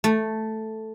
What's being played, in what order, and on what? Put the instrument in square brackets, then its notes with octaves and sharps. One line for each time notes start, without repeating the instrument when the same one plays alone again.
[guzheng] A3